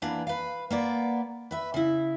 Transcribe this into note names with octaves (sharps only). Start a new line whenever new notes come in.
E3 A#3 B3 D4
B4 F5
A#3 B3 D5
B4 E5
C#3 E4